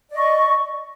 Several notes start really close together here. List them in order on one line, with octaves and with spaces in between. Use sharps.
D5 D#5 C#6